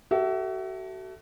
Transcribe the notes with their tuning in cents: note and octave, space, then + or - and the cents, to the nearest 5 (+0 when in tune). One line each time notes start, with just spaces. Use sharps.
F#4 +35 A4 +0 E5 +0